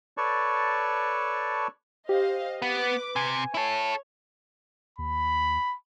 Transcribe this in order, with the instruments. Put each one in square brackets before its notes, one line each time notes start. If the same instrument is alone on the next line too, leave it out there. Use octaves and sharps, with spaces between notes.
[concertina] A4 B4 C#5 D5 A5 C#6
[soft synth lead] G4 [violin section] C5 D#5 F5
[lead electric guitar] B3 [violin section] B4 D6
[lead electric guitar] C3 [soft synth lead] G#5
[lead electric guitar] E4 A4 [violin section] C#5
[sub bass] D#2 [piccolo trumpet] B5